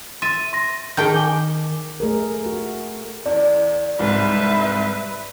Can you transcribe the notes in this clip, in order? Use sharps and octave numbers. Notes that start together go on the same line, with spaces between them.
E5 C6 A6 D#7
C6 A#6
D#3 G#4 G5 A5 G6
G#5 D6 G7
A3 G#4 A#4
F#4
E2 D5
C2 G#2 B4 E5